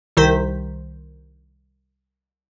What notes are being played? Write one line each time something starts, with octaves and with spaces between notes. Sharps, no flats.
C2 D#3 C5 B6